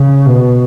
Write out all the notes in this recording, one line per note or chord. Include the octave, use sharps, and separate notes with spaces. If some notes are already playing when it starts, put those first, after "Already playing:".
Already playing: C#3
B2